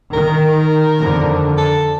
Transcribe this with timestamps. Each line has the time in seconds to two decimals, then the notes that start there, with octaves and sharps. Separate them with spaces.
0.13 D#3 A#4
1.01 F2 D3
1.58 A4